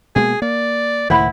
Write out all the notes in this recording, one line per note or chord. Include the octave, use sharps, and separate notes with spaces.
B2 G#3 A#3 G#4
A#3 D5
C#2 A2 D#3 E4 C5 F#5 B5